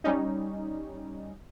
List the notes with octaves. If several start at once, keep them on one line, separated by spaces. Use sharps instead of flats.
G3 C#4 D#4